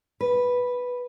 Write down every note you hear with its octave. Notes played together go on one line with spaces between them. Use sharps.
B4